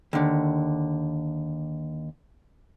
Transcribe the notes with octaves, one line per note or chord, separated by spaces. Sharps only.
D#2 D3